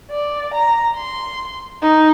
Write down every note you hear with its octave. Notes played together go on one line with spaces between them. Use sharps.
D5
A#5
C6
D#4